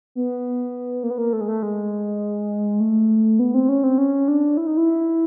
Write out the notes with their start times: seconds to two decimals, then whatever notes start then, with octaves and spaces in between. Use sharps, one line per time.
0.15 B3
1.03 A#3
1.10 B3
1.18 A#3
1.33 A3
1.41 G#3
1.48 A3
1.63 G#3
2.80 A3
3.39 B3
3.54 C4
3.69 C#4
3.83 C4
3.98 C#4
4.28 D4
4.57 E4
4.67 D#4
4.77 E4